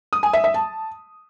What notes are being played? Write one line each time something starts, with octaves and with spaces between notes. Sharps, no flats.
D#6
G#5
E5
E5
A5